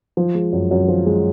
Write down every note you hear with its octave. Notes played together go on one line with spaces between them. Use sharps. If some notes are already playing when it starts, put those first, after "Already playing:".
F3
G#3
F#2
F#2
F3
G#3